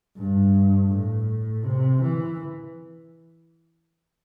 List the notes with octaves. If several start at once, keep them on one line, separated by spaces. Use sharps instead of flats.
G2
A2
C3
E3